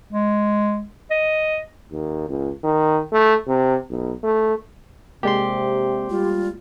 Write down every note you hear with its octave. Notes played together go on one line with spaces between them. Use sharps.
G#3
D#5
D#2
C#2
D#3
A3
C3
B1
A3
C3 G#3 A#3 G4 D5 C6
G3 F4